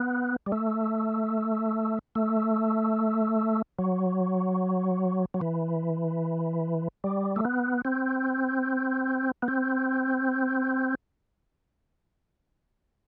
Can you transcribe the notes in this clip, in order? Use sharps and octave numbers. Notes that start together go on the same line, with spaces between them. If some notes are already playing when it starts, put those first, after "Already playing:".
Already playing: B3
G3
A3
A3
F#3
F#3
E3
G3
A3
B3
C4
B3
C4